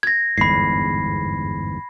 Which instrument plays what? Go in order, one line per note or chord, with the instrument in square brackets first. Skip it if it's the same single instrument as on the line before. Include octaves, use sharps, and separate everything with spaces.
[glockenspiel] G#6 A#6
[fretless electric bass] G1 E2 G#2 [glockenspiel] B5 C7